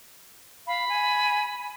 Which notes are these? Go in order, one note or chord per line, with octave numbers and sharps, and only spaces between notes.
F5 B5
G#5